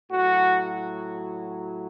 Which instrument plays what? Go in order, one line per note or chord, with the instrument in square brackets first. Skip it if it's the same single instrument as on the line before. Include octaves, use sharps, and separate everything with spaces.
[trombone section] A2 F#3 F#4